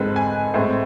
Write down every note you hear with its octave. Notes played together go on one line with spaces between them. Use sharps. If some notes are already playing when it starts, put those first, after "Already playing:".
Already playing: G#2 G#3 C4 A4 B4
G#5
A2 G#3 C4